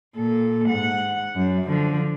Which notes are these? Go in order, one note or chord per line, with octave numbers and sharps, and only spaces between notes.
A#2 A4
G#2 F#5
F#2
D3 F3